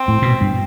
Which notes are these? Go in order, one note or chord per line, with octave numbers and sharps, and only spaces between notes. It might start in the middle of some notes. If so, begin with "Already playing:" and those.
Already playing: C4
A2
B2
G2